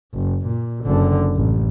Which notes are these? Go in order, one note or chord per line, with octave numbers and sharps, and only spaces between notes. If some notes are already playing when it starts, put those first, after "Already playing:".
F#1
A#2
F#1 D3
A1